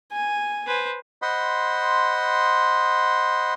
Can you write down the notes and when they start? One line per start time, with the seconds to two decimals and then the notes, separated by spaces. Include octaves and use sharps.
0.12 G#5
0.67 B4 C5
1.22 C5 D#5 F#5 B5 C6